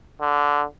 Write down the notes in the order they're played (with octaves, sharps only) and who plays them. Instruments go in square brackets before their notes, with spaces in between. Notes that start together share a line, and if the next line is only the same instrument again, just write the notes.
[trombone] D3